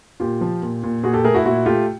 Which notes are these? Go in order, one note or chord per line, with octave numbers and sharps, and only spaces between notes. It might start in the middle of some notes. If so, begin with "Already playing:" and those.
A#2 F4 G4
F3
A#2
A#2
A#2 F#4 G#4
G4 A4
A3 G#4 A#4
E4 F#4
A#2 E4 F#4
A3 F4 G4